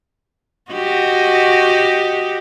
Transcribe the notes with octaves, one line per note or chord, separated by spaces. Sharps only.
F#4 G4 D#5